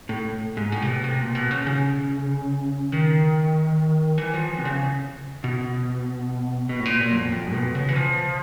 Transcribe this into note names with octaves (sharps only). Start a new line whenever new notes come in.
A2
G#2
A2
C3
B2
C3
A#2
B2
C#3
C#3
D#3
E3
F3
E3
C3
C#3
B2
B2
A2
A#2
A#2
F#2
F2
F2
B2
C#3
E3
F3